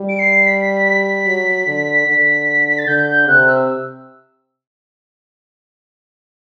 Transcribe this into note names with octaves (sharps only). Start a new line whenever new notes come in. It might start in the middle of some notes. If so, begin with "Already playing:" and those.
Already playing: G3
D7
C7
B6
F#3
D3
D3
B6
A6
D3 G6
G6
C3 F#6
E6